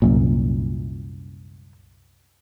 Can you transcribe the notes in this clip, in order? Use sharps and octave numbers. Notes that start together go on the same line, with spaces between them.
C2 F#2 A#2